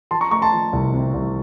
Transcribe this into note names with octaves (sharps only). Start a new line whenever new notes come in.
F3 A5 C6
A#5 C#6
A3 A#5 C#6
A5 C6
F3
C2
C3
C2